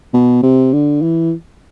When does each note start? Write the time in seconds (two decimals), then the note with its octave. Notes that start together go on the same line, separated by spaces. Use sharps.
0.14 B2
0.43 C3
0.73 D3
1.02 E3